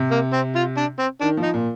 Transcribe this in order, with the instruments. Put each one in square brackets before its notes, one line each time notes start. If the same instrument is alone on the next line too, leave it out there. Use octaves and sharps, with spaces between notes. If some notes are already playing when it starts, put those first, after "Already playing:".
Already playing: [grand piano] C3
[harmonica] A#3
C4
F4
D4
C4
[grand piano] D#3 [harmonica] D4
[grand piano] F3
[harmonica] D#4
[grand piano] A#2